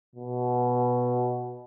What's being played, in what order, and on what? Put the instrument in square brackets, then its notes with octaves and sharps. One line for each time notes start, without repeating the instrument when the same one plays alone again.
[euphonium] B2